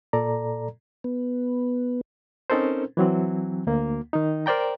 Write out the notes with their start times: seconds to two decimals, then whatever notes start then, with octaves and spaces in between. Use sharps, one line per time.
0.13 A#2 A4 D5 A#5
1.04 B3
2.50 C4 C#4 D#4 A4 A#4 C5
2.97 E3 F#3 C4
3.67 D2 A#3
4.13 D#3 D#4
4.46 A#4 C5 D5 G5 A#5